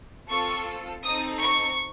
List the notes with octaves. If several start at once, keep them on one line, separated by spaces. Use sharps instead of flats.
C4 F4 A4 C#6
C4 D#4 A4 D#6
C#6